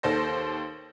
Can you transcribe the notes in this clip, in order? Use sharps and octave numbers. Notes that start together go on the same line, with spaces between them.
D#2 A4 C5 A#6